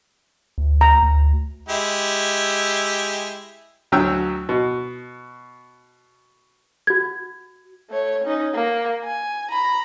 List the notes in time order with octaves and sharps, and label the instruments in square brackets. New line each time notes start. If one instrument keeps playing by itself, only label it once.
[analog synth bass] D2
[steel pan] A#5
[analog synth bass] D2
[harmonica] G#3 E4 G4
[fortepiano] D2 F#3 G5 E6
B2
[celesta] F#4 G#6
[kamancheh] A3 C#5
C#4 D#4
A#3
G#5
A#5 B5